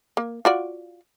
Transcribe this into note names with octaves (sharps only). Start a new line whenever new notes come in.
A#3
F4 F#4 D5